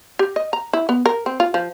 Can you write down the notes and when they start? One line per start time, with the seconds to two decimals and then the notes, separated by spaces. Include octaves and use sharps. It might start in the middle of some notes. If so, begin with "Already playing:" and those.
0.19 G4
0.36 D#5
0.53 A#5
0.73 E4
0.89 B3
1.06 A#4
1.26 C4
1.40 F4
1.54 F3